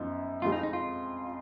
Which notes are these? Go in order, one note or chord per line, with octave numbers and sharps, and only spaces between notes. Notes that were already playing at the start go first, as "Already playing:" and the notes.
Already playing: F#2 F3 B3 D#4
F2 F3 G#3 F4
D#4
D#4
F4